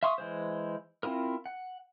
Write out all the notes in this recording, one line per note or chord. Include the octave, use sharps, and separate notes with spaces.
E5 F5 C6 C#6 D#6
E3 G#3 C5
C4 E4 F4 A#4
F#5